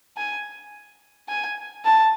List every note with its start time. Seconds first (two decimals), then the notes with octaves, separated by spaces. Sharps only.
0.17 G#5
1.29 G#5
1.85 A5